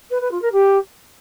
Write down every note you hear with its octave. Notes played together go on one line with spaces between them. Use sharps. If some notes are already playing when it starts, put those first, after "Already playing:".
B4
B4
F4
A#4
G4